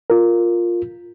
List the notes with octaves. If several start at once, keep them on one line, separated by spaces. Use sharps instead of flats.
F4 A#4